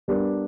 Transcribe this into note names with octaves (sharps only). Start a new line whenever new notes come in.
G3 B3 D4 G4 A#4